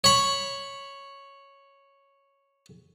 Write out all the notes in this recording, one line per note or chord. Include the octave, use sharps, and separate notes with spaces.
C#5 B5